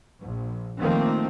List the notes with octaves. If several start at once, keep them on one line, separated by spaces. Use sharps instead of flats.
A#1
D#3 F3 A3 A#3 C4